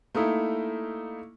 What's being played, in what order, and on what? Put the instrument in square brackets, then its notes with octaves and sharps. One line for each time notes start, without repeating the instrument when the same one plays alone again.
[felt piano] A3 A#3 D#4 E4